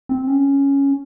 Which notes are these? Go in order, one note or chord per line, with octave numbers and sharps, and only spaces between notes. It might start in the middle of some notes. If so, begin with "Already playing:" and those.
C4
C#4